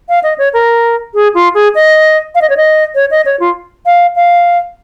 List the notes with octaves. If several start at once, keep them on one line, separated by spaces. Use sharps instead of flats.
F5
D#5
C#5
A#4
G#4
F4
G#4
D#5
F5
D#5
C#5
D#5
C#5
D#5
C#5
F4
F5
F5